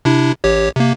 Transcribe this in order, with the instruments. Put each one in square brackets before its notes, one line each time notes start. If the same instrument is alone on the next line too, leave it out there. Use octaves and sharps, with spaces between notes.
[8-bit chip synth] C3 D4 E4
A1 G4 C#5
C3 A#3